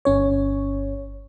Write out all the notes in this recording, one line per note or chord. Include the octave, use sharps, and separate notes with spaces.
G1 C#4 C#5